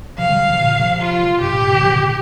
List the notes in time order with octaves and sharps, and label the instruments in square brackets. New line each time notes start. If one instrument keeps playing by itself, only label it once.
[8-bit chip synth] C3 F3 [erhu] F5
[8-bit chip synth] D3 G3
C3 F3
A#2 D3
C3 F3
[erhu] F4
[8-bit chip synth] G2 C3 [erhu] G4
[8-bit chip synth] A#2
G2 C3
A#2 D3
C3 F3
A#2 D3
C3